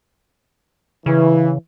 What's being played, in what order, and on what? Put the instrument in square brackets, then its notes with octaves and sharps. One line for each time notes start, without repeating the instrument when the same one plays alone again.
[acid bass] C#3 [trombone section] E3